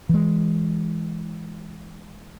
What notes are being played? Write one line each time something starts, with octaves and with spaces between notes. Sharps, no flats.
E3 G#3